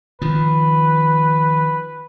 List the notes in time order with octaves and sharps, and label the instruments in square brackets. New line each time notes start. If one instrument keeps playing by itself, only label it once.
[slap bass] D#3 F3 [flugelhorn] B4